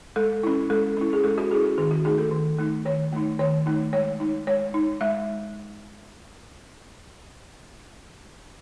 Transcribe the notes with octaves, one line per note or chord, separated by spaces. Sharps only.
G#3 A4
C#4 E4
G#3 A4
C#4 E4
G#4
G#3 A4
F#4
C#4 E4 G#4
G#4
D#3 G#4
F#4
A3 D#4 G#4
A4
D#3
A3 D#4
D#3 C#5
A3 D#4
D#3 C#5
A3 D#4
G#3 C#5
D#4
G#3 C#5
D#4
G#3 E5